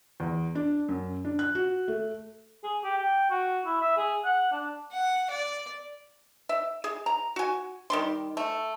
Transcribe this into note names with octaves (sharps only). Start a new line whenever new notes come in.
E2
D4
F#2
D4
F#6
F#4
A3
G#4
G4
G5
F#4
E4
E5
G#4
F#5
D4
F#5
D5
E5
G#4
A#5
F#4 G#5
D#3 G3 C6
A3